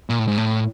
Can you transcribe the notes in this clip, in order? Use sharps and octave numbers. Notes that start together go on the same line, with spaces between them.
A#2
A2
G#2
A2